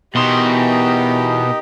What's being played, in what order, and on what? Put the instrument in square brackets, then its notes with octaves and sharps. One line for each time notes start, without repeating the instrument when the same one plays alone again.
[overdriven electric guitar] E2 C6 [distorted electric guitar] B2 [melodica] D#4 D#5 [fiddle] G4 A#4